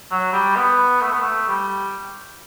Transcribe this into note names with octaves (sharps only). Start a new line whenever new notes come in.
F#3
G3
B3
A3
B3
A3
G3